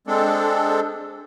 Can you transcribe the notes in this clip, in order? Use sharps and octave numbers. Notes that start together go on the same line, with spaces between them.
G#3 C4 D4 A4